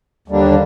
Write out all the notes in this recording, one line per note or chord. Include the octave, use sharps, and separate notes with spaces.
D#2 D3 G3 A#3 D4